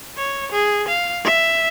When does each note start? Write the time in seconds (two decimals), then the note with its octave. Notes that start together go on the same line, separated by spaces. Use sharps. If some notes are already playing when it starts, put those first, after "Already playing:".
0.17 C#5
0.52 G#4
0.88 F5
1.25 E5